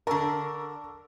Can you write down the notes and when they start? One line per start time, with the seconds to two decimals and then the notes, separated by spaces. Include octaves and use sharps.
0.07 D3 A#4 A5 C#6 E6